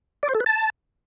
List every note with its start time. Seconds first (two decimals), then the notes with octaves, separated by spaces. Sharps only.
0.23 D5
0.29 C5
0.35 A4
0.40 B4
0.46 A5